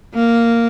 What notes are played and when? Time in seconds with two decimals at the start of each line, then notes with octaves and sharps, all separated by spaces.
0.15 A#3